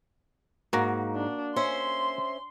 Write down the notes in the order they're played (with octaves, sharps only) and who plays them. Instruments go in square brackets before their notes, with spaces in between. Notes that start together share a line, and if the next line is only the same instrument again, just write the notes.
[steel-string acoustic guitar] G#2 [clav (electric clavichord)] A#3 F#4 A#5
[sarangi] D4
[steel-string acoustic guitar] C#4 C5 E5 [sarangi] C6